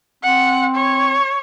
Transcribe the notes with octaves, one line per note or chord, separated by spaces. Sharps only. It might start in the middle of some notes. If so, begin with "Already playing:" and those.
C4 F#5
C#5